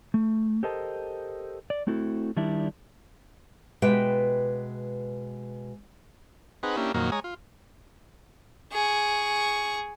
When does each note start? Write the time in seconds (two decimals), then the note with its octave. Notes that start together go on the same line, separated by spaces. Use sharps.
0.14 A3
0.63 G4 A4 A#4 C5 D#5 A5
1.70 D5
1.87 A3 C4 E4 F#4 A4
2.37 D#3 G3 D4 E4
3.82 B2 G#3 G4 B4 E5 G5
6.63 C4 D#4 G#4 B4 F#5
6.77 A#3 C#4 D4 E4 G4
6.94 F2 A#2 D#3 F#3 A#3
7.12 G#3 C#5 G#5 A#5 D#6
7.24 F4
8.73 G#4 C#6